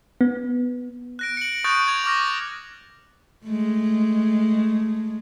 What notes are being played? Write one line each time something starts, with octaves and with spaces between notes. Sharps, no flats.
B3
F#6 A#6 D7
C#7 D7 F#7
C#6 D#6 F#6 G6 A6 D7
G#6 F7
C#6 D6 F6 A#6
G#3 A3